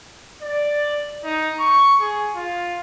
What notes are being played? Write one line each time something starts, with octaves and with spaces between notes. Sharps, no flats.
D5
D#4
C#6
G#4
F4